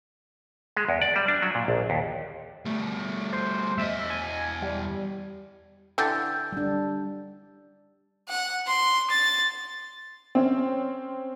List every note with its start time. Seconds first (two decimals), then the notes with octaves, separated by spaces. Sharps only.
0.77 G#3
0.89 E2
1.02 D5
1.16 G3
1.28 D4
1.42 F#3
1.55 A#2
1.68 A#1
1.90 D#2
2.65 G3 A3
3.33 C5
3.78 E2 D#5 E5
4.10 G#5
4.62 G3
5.98 D3 E3 G4 E6 G6 A6
6.52 G3 D4
8.29 F#5
8.67 C6
9.10 A6
10.35 C4 C#4